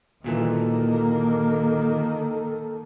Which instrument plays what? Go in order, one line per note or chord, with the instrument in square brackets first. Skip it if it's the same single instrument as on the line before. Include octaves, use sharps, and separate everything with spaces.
[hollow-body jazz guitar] D2 A#2 E3 [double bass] D#3 A#3 [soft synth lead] A4